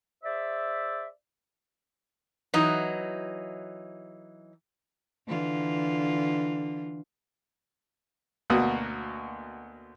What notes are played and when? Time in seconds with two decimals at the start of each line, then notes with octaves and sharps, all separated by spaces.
0.23 G#4 C5 D5 E5
2.54 E3 F#3 D#4
5.27 D3 E3 F4
8.50 D2 B2 A#3 F#4 D#6